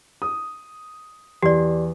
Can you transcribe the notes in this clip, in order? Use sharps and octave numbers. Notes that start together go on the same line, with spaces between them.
D#6
E2 G4 D5